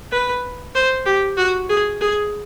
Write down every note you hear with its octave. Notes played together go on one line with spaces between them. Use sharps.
B4
C5
G4
F#4
G#4
G#4